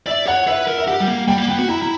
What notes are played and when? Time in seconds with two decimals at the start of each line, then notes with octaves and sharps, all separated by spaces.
0.06 D5 E5
0.27 C#5 F#5
0.47 B4 E5
0.68 A#4
0.78 E5
0.88 G4 F#5
1.00 G3
1.08 A#3
1.28 G3 G5
1.38 A#3
1.49 B3 G5
1.59 F#4
1.68 E4 A#5
1.82 E4